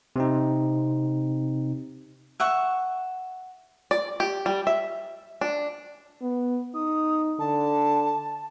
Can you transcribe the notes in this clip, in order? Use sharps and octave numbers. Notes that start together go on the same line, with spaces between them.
C3 C4 D#4
E5 F#5 C#6
D5
G4
G3
E5
D4
B3
D#4 D#6
D3 A5